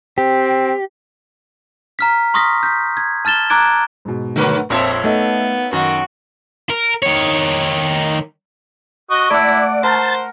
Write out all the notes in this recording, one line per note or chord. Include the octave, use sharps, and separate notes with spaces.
C4 G4
A#5 F6 B6
C6 C#6 D#6 F6 A#6 B6
G6 B6
G#6
A5 F6 A6 E7 G7
A#5 D6 F#6 G#6 D7
G#2 B2
D3 F#3 A3 A#4 B4
A#1 F2 A#3 C4 C#5 E5 A5 C6
A3 B3 D#4 A4 D#5
F#2 D#3 F#4
A#4
D#3 C#5
F#4 D#5 C#6
A3 E4 D5 F#5
A#4 C5 A5